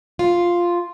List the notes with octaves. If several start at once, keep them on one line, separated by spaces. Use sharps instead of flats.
F4